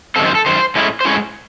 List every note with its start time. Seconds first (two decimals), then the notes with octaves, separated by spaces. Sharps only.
0.16 F#2 D#3 G#3 C4 A4
0.26 C5
0.35 A4
0.46 F#2 D#3 C5
0.75 A2 G#3 C#4 E4
1.01 C5
1.05 A2 G#3 C#4 E4 C#5